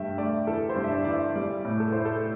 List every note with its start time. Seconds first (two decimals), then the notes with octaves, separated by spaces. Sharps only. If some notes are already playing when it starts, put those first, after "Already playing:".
Already playing: G2 A3 E5 G5
0.18 A3 D5
0.47 E3 A4
0.69 C5
0.76 G2
0.84 E5
0.91 D5
1.04 E3 D5
1.13 E5
1.35 G3 D5
1.65 A2
1.80 A4
1.92 E4 C5
2.05 A4